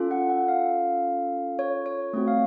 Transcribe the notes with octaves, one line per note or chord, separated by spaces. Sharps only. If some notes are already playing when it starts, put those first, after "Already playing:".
Already playing: C#4 F4 A4
F#5
F#5
F5
C#5
C#5
A3 C4 F#4 C#5
F5